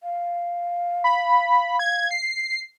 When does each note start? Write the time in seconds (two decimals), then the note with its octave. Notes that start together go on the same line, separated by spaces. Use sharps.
0.03 F5
1.04 B5
1.79 G#6
2.11 C7